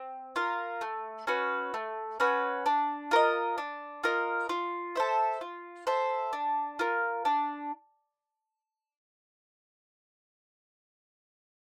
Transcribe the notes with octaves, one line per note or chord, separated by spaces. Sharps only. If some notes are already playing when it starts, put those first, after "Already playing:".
Already playing: C4
F4 A#4
A3
C#4 F#4 B4
A3
C#4 F#4 B4
D4
F4 A#4 D#5
D4
F4 A#4 D#5
F4
A4 C5 E5
F4
A4 C5 E5
D4
F4 A#4
D4